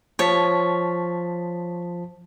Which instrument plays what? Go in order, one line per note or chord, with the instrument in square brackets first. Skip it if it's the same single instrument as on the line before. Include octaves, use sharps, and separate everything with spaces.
[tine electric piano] F3 A5 B6 [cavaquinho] C#5